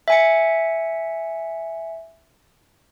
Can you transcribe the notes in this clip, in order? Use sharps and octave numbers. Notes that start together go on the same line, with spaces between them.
E5 G#5 C#7